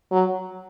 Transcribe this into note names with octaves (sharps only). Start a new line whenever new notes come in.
F#3